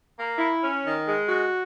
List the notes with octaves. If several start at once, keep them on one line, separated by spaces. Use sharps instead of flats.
A#3
E4
C#4
D#3
G#3
F#4